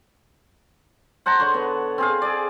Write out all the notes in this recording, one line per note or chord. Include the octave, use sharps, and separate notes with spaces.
C5 F#5 A5 A#5
D3 C#5 C6 C#6
B3
C4 G#4 F5
G#4 D5